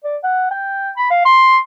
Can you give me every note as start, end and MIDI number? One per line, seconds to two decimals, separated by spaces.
0.04 0.17 74
0.24 0.48 78
0.51 0.91 79
0.97 1.07 83
1.10 1.25 77
1.25 1.58 84